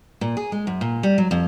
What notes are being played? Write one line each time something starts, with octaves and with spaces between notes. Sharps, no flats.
A#2
G#4
G#3
F#2
A#2
G3
F#3
F2